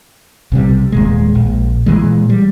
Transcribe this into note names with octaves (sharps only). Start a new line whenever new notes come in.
B1 C3 G3
D#1 A#2 G#3
A#1
A#2 E3 G#3
G3